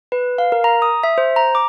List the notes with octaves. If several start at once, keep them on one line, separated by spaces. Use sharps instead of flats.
B4
F5
A#4
A#5
D#6
E5
C5
A#5
D6